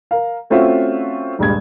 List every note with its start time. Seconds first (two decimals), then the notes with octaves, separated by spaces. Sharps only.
0.11 A#4 F5
0.50 A3 C4 C#4 F4 F#4 E5
1.39 D#1 G2 G3 G#3 G#6